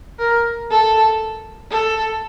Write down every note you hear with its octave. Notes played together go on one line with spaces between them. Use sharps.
A#4
A4
A4